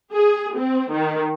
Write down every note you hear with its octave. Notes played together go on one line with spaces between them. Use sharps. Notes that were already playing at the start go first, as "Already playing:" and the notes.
G#4
C4
D#3